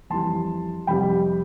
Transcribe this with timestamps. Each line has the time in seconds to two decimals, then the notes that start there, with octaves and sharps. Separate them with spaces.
0.10 F2 E3 G3 A5 C6
0.87 F2 C3 G3 G5 B5